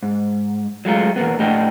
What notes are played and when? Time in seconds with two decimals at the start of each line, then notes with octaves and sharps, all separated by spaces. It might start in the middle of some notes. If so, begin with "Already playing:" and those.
0.03 G#2
0.85 F#3 G#3 A3 F4
1.16 E2 B2 A#3 B3
1.39 A2 A3 D4 G4 D#5 F#5